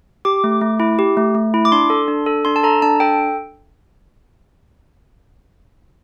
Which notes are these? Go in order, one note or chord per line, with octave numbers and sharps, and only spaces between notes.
G4 D6
A3
A3
E4
G4
A3
A3
E4
D6
D4 C6
A4
D4
A4
D4 C6
A5
A4 A#5
D4 A5
A4 G5